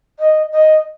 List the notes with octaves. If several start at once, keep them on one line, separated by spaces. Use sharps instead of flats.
D#5
D#5